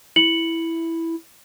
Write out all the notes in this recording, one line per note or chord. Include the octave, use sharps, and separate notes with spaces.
E4 C#7 F#7